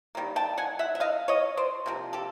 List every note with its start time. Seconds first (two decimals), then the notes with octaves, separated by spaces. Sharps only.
0.15 D#3 G3 A#3
0.36 G5 A5
0.58 F#5 G#5
0.79 E5 F#5
0.95 E5
1.00 D#5 F5
1.28 C#5 D#5
1.57 C5 D5
1.86 C3 F3 A#3
2.13 G4 A4